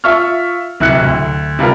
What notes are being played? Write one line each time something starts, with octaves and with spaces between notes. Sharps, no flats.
F4 E5 C#6 F6
D1 C3 E4 F#6 C#7
D2
C3 G3 F4 A#4